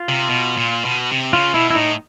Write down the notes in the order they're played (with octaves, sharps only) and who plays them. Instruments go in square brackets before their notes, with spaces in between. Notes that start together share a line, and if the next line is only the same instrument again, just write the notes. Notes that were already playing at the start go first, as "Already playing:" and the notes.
Already playing: [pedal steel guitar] F4
[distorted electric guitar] C3
B2
A#2
B2
C3
[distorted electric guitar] C#3 [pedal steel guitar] F4
[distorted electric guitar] B2 [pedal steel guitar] E4
[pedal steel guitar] E4
[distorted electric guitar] A2 [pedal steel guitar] D#4